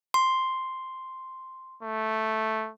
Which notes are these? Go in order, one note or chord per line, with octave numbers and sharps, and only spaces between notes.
C6
A3